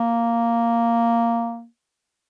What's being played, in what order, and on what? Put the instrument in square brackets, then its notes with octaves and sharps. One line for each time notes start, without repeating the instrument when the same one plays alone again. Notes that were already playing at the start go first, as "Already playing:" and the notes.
Already playing: [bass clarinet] A#3